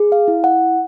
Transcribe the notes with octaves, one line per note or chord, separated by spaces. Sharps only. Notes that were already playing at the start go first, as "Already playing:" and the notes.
Already playing: G#4
F5
E4
F#5